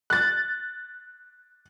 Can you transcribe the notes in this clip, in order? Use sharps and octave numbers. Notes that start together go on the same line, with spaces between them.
F#6 A6